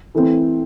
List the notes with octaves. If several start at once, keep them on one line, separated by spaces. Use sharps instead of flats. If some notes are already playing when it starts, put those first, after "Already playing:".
E3 A3 C4